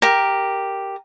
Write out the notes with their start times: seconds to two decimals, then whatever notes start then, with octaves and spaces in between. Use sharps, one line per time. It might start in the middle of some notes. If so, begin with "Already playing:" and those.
0.02 G4 A#4